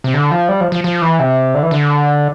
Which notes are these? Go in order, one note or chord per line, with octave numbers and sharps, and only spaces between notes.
C3
D3
F3
G3
F3
F3
F3
E3
C3
D3
E3
D3